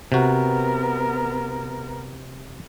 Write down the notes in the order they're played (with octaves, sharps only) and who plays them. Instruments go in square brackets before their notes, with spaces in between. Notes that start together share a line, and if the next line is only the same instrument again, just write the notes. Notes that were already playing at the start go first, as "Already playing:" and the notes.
[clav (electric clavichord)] C3 F#4 [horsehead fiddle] B3 A#4